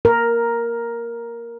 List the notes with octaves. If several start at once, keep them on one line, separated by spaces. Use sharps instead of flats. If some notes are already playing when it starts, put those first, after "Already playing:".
A#4